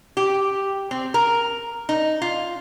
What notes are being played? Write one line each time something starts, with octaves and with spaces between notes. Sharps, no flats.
G4
C4
A#4
D#4
F4